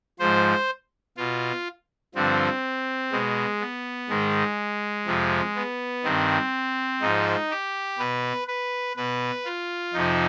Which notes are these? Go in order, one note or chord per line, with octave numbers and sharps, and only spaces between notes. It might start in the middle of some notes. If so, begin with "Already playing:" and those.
G#2 F3 C5
B2 F4
G2 D3 F3 C4
B2 G#3
B3
G#2 D#3 G#3
F2 C3 F3
B3
G2 D#3 C4
G#2 F3 D#4
G4
B2 B4
B4
B2 B4
F4
F2 C3 F3 D#4